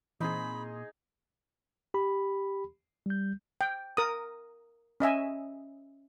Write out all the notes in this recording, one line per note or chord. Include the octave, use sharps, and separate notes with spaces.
A#2 E3 C4 D#4 G#4 B5
G4 B5
G3 G6
G5
A#4 D#6
C#4 D#5 E5 G#5